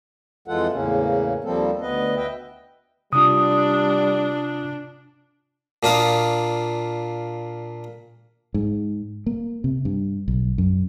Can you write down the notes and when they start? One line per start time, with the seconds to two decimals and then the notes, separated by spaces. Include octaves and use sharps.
0.48 F2 E3 G#3 F4 A4 F#5
0.71 E2 A2 C#3 A#3 C#4
1.44 D#2 F3 G3 A#3 C4 A4
1.81 D2 B3 B4 D#5
2.16 B4 D#5 E5 G5
3.13 C3 G3 D4 F4 D#6
5.83 A#2 D4 F4 D#6
8.54 G#2
9.26 A#3
9.64 C3
9.85 G2
10.28 B1
10.58 F#2